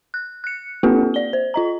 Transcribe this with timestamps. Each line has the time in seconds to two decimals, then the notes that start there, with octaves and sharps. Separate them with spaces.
0.14 F#6
0.44 F#6 C#7
0.83 A#3 C4 F4 G4 A4 B4
1.14 D5 G7
1.33 C5
1.54 F4 D#5 A#5